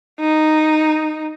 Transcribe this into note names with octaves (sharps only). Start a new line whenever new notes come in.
D#4